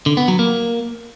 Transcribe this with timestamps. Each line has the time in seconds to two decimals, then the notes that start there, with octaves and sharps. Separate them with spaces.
0.06 D3
0.17 B3
0.28 F#3
0.39 A#3